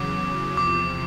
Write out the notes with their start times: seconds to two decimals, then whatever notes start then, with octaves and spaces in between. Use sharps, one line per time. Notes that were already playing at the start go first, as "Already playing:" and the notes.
Already playing: E2 C#3 F#3 D6
0.57 E2 C3 F3 D6